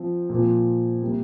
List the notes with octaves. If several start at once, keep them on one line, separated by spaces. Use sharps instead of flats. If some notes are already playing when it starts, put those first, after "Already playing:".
Already playing: F3 C4 F4
A#2 F3 C4 F4
C3 G3 A#3